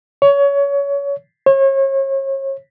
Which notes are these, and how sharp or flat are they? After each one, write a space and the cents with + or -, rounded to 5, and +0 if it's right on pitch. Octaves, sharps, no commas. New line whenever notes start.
C#5 +25
C#5 -35